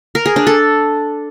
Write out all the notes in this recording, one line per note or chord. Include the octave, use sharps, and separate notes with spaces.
A#4
G#4
D4
A4